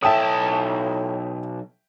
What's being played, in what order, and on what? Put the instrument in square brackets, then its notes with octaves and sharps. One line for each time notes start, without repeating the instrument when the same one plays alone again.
[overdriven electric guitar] B1 A5 [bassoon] A2 [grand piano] E5 G5 D#6